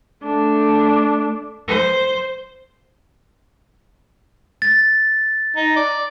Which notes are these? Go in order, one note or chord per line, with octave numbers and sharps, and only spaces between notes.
A3 D4
C5
A6
D#4
D5